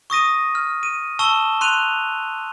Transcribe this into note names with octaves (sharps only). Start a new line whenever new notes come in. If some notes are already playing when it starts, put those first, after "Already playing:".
C#6 D#6 A#6 D#7
F6
D#7
A5 C#6 E6 E7 G7
C6 F#6 D#7 F7